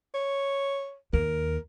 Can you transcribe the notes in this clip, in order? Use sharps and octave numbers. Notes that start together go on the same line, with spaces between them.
C#5
D#2 A#4